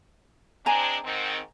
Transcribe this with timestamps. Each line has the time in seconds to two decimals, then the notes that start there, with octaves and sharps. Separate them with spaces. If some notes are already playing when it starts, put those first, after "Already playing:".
0.66 G#3 C4 D4 G#5 A#5
1.04 G#2 D#3 C4